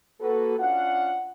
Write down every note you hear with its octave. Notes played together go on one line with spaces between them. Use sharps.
A#3 F#4 A4 B4
C#4 D4 F4 F5 F#5